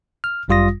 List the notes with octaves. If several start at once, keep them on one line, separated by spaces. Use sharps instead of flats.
F6
G1 F#2 G3 F4 D#6 A#6